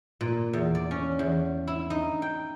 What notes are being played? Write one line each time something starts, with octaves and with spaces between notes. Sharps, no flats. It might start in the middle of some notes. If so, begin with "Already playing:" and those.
A#2
E2
D5
C#4
E2
E4
D#4
G5